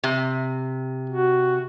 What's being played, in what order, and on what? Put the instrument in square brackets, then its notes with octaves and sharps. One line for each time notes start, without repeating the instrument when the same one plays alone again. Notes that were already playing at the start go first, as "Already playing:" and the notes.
[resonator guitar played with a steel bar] C3
[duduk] F#4